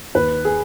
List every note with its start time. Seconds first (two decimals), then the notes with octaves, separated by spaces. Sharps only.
0.15 D#2 B4
0.45 G#4